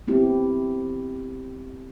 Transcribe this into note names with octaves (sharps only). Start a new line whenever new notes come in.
B3 C4 E4 G4